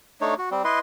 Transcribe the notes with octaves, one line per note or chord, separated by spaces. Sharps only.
A3 D4 D#4 C#5
F#4
G3 C4
E4 B4 D#5 C6